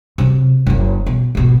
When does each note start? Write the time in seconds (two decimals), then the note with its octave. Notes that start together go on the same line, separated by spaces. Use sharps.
0.18 C3 F#3
0.67 F#1 F#2
1.06 B2
1.35 G#1 B2